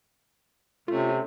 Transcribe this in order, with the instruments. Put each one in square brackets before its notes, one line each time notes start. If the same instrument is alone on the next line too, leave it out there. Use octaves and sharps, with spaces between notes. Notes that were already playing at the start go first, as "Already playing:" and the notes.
[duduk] C3 [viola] A3 C#4 [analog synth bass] F4